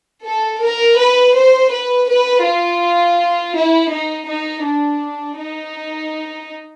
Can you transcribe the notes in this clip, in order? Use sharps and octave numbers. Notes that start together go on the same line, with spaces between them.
A4
A#4
B4
C5
B4
B4
F4
E4
D#4
D#4
D4
D#4